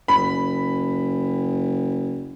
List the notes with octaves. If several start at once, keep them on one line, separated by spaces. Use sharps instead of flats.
F#1 B5